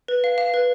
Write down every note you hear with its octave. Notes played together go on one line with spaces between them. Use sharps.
B4
F5
F5
B4